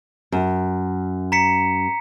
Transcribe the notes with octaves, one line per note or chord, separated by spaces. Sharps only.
F#2
A#5 B6 C#7